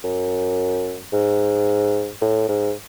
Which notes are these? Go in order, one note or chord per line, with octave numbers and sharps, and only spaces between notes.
F#2
G#2
A2
G#2